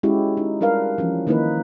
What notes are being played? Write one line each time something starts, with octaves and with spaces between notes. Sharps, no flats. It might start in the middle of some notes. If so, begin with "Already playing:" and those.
G#3 C#4 E4 F#4 G4
D#4
G3 D4 A#4 B4 F5
E3 F3 C#4
D#3 A#3 D#4 E4 B4